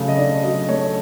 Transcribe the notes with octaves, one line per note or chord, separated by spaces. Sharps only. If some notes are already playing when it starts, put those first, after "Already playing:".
Already playing: C#3 F#3 A3
D#5
D4 D5
F#3 D#5
A3 C#5